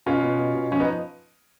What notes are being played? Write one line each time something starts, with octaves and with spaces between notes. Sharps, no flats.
B2 C#4 F4
B2
B2
B2
F3 C#4
B3 D#4